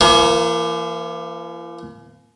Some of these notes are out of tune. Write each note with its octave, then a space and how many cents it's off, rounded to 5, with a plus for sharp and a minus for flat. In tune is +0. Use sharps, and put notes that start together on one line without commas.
E3 +45 A#3 +0